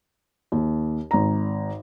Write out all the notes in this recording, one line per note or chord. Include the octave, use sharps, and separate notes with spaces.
D#2
G#1 A#5